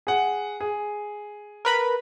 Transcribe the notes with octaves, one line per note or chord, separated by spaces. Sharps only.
G#4 F#5
G#4
A#4 B4 B5